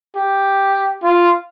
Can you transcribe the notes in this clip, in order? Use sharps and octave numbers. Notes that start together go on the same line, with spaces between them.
G4
F4